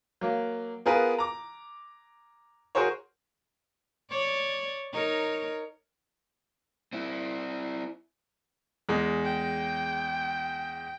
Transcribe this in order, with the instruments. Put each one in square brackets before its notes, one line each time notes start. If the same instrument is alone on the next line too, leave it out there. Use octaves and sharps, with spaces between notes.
[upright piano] F#3 A#3
B3 F4 G#4 A#4 B4
A#5 D6
F#4 G#4 A#4 C5 C#5
[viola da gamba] C#5 D5
D#4 A#4 C#5
[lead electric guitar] C4 E4
[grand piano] E2 G#3
[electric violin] G5